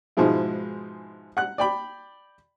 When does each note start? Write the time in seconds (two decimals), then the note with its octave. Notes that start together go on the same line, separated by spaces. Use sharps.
0.17 G#2 B2 F3 G#3 E4
1.37 F#5 F#6
1.58 D5 G5 B5